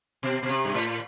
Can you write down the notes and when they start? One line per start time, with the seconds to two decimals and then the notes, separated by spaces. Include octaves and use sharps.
0.23 B2
0.43 B2
0.49 C3
0.65 G2
0.74 A2